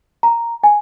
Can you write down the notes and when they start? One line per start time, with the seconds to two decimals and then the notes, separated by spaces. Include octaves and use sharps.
0.23 A#5
0.64 G#5